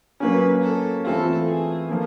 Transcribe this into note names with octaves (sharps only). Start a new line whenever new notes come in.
F#3 A#3 C#4 B4
A4
E3 A3 C4 F4 A4
G#4
F3 A#3